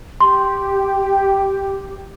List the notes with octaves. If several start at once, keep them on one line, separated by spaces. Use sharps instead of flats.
G4 C6